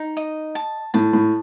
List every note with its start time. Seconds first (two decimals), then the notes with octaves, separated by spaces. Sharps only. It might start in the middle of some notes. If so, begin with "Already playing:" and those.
Already playing: D#4
0.17 D#5
0.55 A5
0.94 A2 A5
1.13 A2